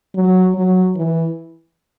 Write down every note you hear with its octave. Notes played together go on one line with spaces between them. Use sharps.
F#3
F#3
E3